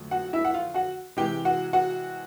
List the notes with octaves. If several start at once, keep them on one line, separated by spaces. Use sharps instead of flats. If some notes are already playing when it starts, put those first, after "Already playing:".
Already playing: F2 D3 F#3 A3
F#4 F#5
E4 E5
F#5
F4 F5
F#4 F#5
C3 E3 G#3 G4 G5
F#4 F#5
F#4 F#5